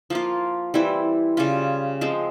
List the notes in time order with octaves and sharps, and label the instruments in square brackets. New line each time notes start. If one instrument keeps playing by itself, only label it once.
[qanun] F3 A#3 F4
E3 G3 C4 E4
C#3 G3 C#4 F4
F3 G#3 C4